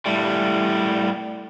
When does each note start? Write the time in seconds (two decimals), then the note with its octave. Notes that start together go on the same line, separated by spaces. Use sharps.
0.06 A2 G3